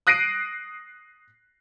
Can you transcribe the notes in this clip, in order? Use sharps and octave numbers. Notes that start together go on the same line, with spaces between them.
D#6 F#6 A#6 C7 D7 D#7